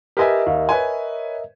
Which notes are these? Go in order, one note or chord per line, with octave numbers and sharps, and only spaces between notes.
G4 A#4 B4 D#5 E5 G#5
D#2
B4 C#5 G#5